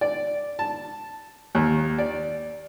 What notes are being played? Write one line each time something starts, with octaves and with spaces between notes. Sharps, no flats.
D5
A5
D#2
D5